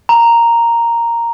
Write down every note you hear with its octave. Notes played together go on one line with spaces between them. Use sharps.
A#5